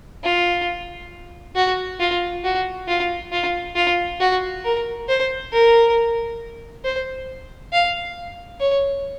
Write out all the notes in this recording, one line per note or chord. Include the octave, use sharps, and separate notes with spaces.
F4
F#4
F4
F#4
F4
F4
F4
F#4
A#4
C5
A#4
C5
F5
C#5